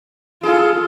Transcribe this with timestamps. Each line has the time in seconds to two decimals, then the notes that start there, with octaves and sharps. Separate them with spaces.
0.43 F4 G#4 A4